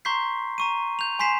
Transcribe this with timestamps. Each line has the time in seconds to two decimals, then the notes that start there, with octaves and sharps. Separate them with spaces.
0.05 A#5 C6 C#6 G6 B6 C7
0.58 A#5 C#6 D#7
0.99 G6 F7
1.19 G#5 C6 G6 B6 C7 E7